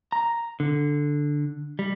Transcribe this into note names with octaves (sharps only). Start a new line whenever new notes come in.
A#5
D3
G3